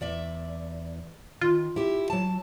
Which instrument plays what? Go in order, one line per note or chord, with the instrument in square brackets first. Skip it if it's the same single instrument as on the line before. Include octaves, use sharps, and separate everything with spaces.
[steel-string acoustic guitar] E2 D5 E5
[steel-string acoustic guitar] D#3 [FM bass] F4
[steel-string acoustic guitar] E4 G4
F#3 A5